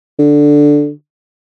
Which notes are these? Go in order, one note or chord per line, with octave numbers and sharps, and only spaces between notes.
D3